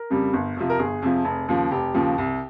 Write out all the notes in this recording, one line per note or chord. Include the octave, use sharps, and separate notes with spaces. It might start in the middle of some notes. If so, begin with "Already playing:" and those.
Already playing: A#4
F2 C#3 G3
G1
F2 C3 F3
A#4
G1 G#4
F2 C3 F3
F1
D#2 C#3 F3
F1 G4
D#2 C#3 F3
C2